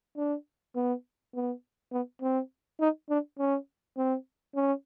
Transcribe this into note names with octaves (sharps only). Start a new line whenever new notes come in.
D4
B3
B3
B3
C4
D#4
D4
C#4
C4
C#4